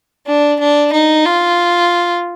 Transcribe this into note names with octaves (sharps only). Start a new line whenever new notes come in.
D4
D4
D#4
F4